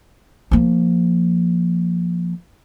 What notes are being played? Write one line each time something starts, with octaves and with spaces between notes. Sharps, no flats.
F3 A#3